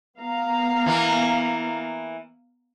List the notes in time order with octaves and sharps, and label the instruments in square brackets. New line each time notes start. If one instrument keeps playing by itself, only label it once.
[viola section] B3 F5 A#5
[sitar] E3 A#3